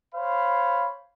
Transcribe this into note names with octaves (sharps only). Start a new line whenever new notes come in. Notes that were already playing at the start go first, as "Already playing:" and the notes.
C5 C#5 F5 B5